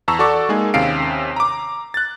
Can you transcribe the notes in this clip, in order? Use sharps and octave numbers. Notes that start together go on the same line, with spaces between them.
E2 A5 A#5 C#6 E6
F#4 A4 D5 C#6 D6 E6
G#3 A#3 D#4 G#4
D#2 C3 C#4 F5 C7 D7
A#5 D6
F#6 A6